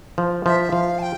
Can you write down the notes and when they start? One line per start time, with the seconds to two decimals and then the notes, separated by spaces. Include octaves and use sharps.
0.18 F3
0.46 F3 E5
0.72 F3 F5
0.99 A5
1.02 G5